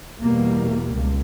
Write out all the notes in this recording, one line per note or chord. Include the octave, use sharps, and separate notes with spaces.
E2 B2 G3 A#3
C#2